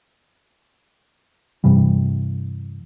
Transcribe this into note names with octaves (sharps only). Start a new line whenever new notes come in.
G2 C3 E3 G3